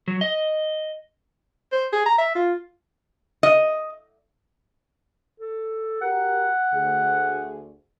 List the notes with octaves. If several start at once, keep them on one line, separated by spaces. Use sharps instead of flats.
F#3
D#5
C5
G#4
A#5
E5
F4
D#5
A4
F#4 G4 A#4 F#5
D2 G#4